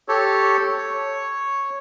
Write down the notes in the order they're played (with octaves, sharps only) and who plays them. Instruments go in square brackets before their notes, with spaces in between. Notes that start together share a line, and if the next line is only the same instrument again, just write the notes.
[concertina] G4 A4 C#5
C#5